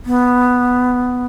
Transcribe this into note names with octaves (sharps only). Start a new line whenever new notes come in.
B3